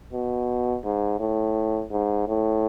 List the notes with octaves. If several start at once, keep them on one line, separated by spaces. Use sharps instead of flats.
B2
G#2
A2
G#2
A2